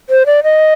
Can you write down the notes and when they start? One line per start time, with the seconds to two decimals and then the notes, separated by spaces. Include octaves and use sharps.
0.10 C5
0.26 D5
0.43 D#5